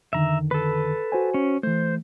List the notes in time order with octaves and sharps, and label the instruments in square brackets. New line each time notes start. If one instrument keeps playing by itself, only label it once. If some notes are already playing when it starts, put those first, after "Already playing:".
[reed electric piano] F2 D3 D#3 [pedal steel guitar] E5 A#5
[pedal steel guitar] A4 B4
[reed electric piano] F#4 C5 G#5
[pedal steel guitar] C#4
[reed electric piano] E3 A3 [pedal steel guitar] C5